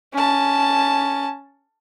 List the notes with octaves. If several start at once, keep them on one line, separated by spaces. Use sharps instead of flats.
C#4 A5